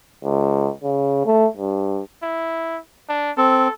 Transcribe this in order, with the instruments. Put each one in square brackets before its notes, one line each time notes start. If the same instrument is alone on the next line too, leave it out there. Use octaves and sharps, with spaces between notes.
[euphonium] C#2
C#3
A3
G2
[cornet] E4
D4
[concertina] C4 [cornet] A4